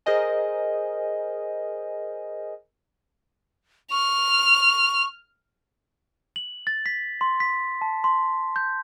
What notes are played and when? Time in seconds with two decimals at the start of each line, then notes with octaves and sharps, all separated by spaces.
0.06 G#4 A#4 C5 D#5 G#5
3.91 C#6 F6
6.36 F#7
6.67 A6
6.86 B6
7.21 C6
7.40 B6
7.81 A5
8.04 C6
8.56 G6